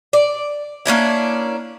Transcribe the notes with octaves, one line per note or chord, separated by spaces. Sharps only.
D5
A#3 C#4 D4 E4